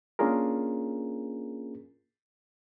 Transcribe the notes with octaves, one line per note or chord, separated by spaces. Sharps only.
A#3 C#4 D4 F4 G#4 A#4